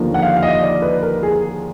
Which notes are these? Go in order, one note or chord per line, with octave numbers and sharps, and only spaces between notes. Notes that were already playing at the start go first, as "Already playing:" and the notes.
Already playing: D#2 D3 F3 A#3 F4
F#5
F5
F5
D#5
D5
B4
A#4
G#4